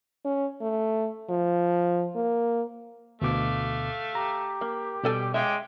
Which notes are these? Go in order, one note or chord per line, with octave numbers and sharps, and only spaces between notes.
C#4
A3
F3
A#3
D2 B2 A3 F5 D6
G4 A#5
A#3
B2 G3 A4 G5 G#5
G#3 C#4 E5 F5 G5 D6